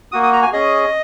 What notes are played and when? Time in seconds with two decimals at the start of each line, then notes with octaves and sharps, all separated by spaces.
0.12 A#3 F#4 D#6
0.23 D#6
0.33 A#5
0.43 G#5
0.52 C#4 G#4 D#5